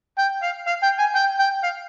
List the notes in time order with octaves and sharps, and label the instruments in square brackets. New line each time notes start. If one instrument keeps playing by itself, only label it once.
[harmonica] G5
F5
F5
G5
G#5
G5
G5
F5